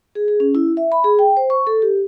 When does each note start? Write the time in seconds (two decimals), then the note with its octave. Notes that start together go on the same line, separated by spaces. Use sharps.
0.15 G#4
0.28 G#4
0.40 C#4
0.55 E4
0.77 E5
0.92 B5
1.04 G#4
1.19 G5
1.37 C5
1.50 C#6
1.67 A4
1.82 G4